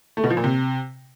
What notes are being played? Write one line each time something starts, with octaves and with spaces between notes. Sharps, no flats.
A3
B2
F3
A#2
C3